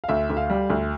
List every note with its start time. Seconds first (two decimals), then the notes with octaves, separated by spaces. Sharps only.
0.04 F5
0.09 D2 E5
0.30 D2
0.37 F5
0.50 G3
0.70 D2